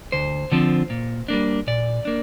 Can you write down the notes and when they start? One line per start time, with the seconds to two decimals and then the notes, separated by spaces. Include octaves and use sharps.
0.12 D2 C5
0.52 D3 F3 C4
0.90 A#2
1.28 G3 A#3 D4
1.67 A#2 D5
2.05 A#3 D4